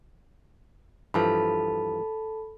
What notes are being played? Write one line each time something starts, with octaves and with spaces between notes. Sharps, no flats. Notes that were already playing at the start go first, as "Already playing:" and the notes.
G2 E3 F3 A4 A5 B5